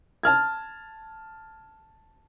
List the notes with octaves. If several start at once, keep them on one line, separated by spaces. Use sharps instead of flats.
A5 F6 G#6